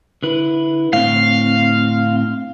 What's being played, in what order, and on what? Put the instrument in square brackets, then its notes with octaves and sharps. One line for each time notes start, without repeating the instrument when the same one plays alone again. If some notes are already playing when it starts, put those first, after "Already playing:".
[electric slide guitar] D3 E4 B4
[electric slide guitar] A2 D3 C4 [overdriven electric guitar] F5